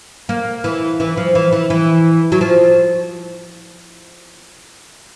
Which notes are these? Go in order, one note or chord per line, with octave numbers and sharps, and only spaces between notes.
A#3
E3
E3
F3
E3
E3
E3
F#3
F3